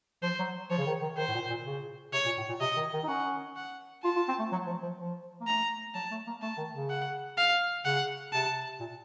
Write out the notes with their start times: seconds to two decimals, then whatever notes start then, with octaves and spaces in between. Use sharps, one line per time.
0.23 F3 C5
0.39 F#3
0.70 F3 C#5
0.78 C#3
0.87 D#3
1.01 D#3
1.17 D#3 C5
1.28 A2
1.34 A#2
1.50 A#2
1.66 C#3
2.13 C3 C#5
2.25 A#2
2.37 A2
2.49 A#2
2.60 C3 D#5
2.76 D#3
2.93 D#3
3.03 D#4
3.08 C#4 F#5
3.56 F#5
4.03 F4 A5
4.16 F4
4.28 C4
4.39 A3
4.52 F#3
4.67 F3
4.83 F3
4.99 F3
5.41 A#3
5.47 A3 A#5
5.95 F#3 A5
6.11 A3
6.27 A#3
6.42 A3 A5
6.57 D#3
6.74 C#3
6.90 F#5
7.37 F5
7.85 C#3 F#5
8.33 C3 A5
8.80 A#2